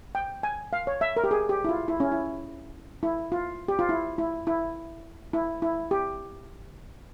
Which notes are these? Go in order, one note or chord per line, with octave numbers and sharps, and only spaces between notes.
G5
G#5
F5
C#5
E5
A#4
G4
G#4
G4
E4
F4
E4
C#4
E4
E4
F4
G4
F4
E4
E4
E4
E4
E4
G4